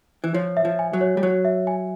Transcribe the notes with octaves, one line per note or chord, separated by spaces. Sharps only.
E3
F3 C#5
E5
F3
G#5
F#3
C#5
G3
F#3 C#5
E5
G#5